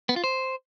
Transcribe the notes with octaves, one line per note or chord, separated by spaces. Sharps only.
B3
F4
C5